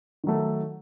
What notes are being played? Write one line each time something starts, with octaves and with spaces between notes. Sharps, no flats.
D#3 F#3 A3